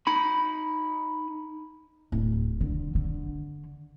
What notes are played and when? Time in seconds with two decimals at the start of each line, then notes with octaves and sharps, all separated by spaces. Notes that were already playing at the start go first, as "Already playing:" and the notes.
0.07 D#4 B5
2.12 D1
2.61 D3
2.95 D3